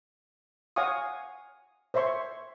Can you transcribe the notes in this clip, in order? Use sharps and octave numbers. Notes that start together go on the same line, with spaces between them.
C#5 F5 F#5 G#5 C#6 D#6
C5 C#5 E5 C6 C#6